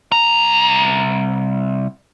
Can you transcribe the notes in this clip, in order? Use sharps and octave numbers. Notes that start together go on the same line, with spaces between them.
C2 A#5